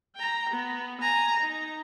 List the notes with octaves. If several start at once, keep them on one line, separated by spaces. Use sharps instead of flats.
G5 A#5
B3
G#5 A#5
D#4